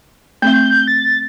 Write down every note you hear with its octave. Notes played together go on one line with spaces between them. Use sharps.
A3 C4 E5 G6
A6